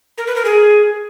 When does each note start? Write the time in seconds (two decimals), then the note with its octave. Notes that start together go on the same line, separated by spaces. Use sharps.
0.18 A#4
0.27 B4
0.36 A#4
0.45 G#4